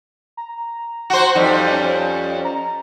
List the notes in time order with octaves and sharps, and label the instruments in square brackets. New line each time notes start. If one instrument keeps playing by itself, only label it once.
[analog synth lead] A#5
[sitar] F#4 C5
[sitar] F2 G3 [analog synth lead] D#4
[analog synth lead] C#4
A#5